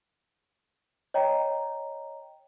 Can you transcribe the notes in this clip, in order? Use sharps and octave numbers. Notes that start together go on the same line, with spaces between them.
C#5 D#5 G5 A#5